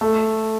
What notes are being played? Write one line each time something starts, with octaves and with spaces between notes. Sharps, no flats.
A3